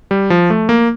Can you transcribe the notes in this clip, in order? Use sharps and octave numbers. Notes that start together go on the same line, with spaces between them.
G3
F3
A3
A#3